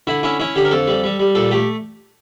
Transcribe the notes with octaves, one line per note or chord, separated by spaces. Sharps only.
D3 E4
C#4 E4
C#4 E4
D3 G4
A#4
F2 A4
G3
G3
G3
A#2 A4
A3 G4